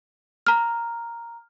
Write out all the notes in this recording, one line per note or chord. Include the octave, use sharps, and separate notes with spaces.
A#5 F6